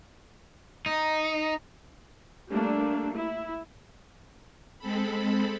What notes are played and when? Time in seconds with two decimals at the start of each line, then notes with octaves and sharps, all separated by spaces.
0.86 D#4
2.50 G3 A3 A#3 D4
3.16 E4
4.79 G#3 C4 A4 B5